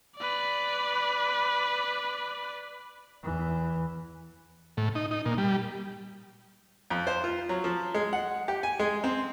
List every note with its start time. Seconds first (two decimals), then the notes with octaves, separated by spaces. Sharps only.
0.17 B4 D5
3.23 E2 E3
4.77 A2
4.95 D#4
5.11 D#4
5.26 A#2
5.38 G3
6.90 F2
7.07 C5
7.24 F4
7.49 F#3
7.64 F3
7.94 G#3
8.13 F#5
8.48 G4
8.63 G#5
8.79 G#3
9.04 C4